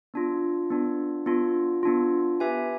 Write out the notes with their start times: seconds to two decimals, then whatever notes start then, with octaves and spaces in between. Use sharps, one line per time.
0.14 B3 D4 F4
0.70 B3 D4 F4
1.26 B3 D4 F4
1.83 B3 D4 F4
2.40 G4 B4 E5 G#5